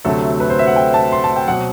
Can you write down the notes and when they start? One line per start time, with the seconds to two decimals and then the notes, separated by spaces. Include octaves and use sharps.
0.05 D2 C3 F#3 A3 A4
0.40 B4
0.50 C5
0.59 E5
0.67 F#5
0.76 G5
0.94 A5
1.12 C6
1.24 A5
1.36 G5
1.48 B2 F#3 C4 F#5